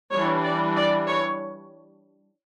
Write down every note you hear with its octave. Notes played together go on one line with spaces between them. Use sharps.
E3 G3 D4 C#5
D5
D5
C#5